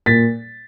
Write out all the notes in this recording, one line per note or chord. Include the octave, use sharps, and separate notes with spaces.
A#2 A6 B6